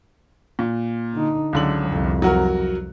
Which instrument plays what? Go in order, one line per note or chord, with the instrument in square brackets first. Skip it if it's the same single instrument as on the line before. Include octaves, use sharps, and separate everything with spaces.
[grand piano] A#2
[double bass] D3 D#4
[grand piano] C#2 D3 F#7 [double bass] F#3
[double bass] C2 F2
[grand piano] F#3 F#4 A#4